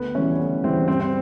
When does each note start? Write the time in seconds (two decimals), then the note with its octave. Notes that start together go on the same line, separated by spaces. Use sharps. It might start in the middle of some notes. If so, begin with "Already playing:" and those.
Already playing: D2 B3
0.14 C#3 E3 G3 C#4
0.39 D2
0.63 C#3 E3 G3 C4
0.88 G2 C4
1.00 C4